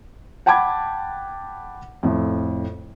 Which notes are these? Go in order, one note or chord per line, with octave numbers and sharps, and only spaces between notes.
F#5 G5 A5 B5 D6 G#6
F2 A2